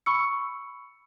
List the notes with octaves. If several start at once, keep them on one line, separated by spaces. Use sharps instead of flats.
B5 C#6 E6 C#7